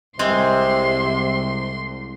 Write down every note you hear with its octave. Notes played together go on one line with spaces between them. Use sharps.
C2 C3 G#3 C4 C6